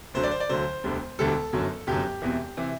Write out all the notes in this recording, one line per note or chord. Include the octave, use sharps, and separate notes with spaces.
D2 D3 F#3 C5
D5
C5
D5
D2 D3 F#3 C5
E1 D2 D3 G3
E1 D2 D3 G3 A4
G1 F#2 D3 F#3
G1 F#2 D3 F#3 G4
E1 E2 C3 E3
C3 E3